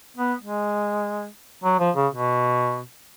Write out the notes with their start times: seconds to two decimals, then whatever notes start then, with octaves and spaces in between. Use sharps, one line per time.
0.17 B3
0.42 G#3
1.64 F#3
1.80 F3
1.96 C#3
2.12 B2